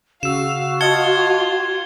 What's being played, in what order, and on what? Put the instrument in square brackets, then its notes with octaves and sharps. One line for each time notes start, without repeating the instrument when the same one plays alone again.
[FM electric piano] C#3 E6 [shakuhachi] F#4 [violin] F5 [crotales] E7
[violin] F4 [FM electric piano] D#5 F5 A5 [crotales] G#6 C#7 G7